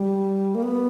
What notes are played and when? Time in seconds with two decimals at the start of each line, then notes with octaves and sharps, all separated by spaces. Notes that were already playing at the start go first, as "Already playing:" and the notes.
Already playing: G3
0.55 A#3
0.63 B3